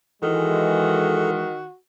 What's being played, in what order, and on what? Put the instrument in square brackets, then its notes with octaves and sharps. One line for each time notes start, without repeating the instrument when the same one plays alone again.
[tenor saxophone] D#3 [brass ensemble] E3 G#3 [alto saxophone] F#4 [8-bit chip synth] A4